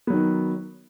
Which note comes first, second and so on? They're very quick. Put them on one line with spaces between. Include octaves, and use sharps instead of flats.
B3 F#3 D#3